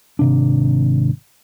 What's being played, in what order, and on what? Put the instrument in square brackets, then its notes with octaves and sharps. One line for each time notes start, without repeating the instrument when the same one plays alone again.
[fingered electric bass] G#1 C3 D4